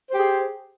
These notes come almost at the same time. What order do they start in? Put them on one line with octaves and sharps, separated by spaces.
C5 G4 G#4